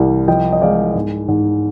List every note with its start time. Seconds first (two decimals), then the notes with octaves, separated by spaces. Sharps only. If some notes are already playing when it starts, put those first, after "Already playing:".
Already playing: C2 G3
0.28 F3 D#5 G5
0.52 D#5
0.62 G#3 D5 F5
0.95 G#2
1.28 G#2